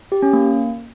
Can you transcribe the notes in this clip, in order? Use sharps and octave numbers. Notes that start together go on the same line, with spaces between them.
G4
C#4
A#3